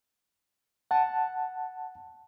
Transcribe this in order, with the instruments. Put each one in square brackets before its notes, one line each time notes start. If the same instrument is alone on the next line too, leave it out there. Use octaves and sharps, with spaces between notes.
[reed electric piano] F#5 A5